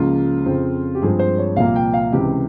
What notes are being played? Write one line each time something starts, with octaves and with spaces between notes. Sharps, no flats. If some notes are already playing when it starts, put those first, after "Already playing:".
Already playing: C#2 C#3 F3 A#3 F4
F2 C#3 F3 C4
G4
G2 F3 G#3 C4 G#4
C5
C#5
C2 A#2 F3 A#3 F5
G5
F5
C#2 C3 E3 G4